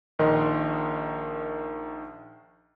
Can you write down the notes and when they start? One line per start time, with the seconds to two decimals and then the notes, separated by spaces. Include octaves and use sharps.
0.19 A#1 D#3 A#4 D#5 C6